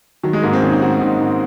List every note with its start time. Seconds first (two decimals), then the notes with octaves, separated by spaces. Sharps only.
0.23 D#3 F#3
0.33 G#3
0.42 G#2 A#3
0.53 C4
0.62 D#3 C#4
0.71 D#4
0.81 G#2 F#4
1.01 D#3 D#4
1.20 G#2